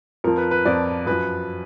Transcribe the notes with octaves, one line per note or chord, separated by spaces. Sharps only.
F2 F3 A#4
B4
B4
F2 F3 D5
F#2 F3 B4